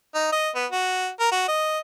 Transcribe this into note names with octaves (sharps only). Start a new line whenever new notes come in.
D#4
D#5
B3
F#4
A#4
F#4
D#5